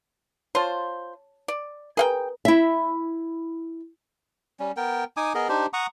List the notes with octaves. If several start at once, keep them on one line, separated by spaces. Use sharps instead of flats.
F4 C5 C#5 A5
D5
G#4 A#4 B4 F5 G5
E4 E5
G3 C#4
B3 A#4 G5
D#4 G#5 D6 D#6
B3 G#4 A#4 D#5
D4 D#4 G4 C5
F#5 A#5 C#6 D#6